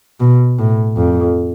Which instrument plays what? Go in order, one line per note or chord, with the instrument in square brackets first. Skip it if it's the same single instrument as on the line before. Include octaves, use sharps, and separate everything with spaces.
[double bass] B2
A2
F2